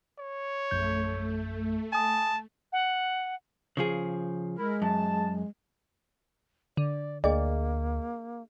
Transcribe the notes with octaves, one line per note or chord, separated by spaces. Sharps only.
C#5
A#1 F#2 A3 G6
G#5 A5 D#6
F#5
C#3 F3 G#4
G#3 E4 A#4
F#2 A5
D3 D5
D2 A#3 D4 G#4 D5 D#5